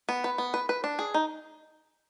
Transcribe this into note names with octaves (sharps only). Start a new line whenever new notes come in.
B3
B4
B3
B4
B4
D4
G#4
D#4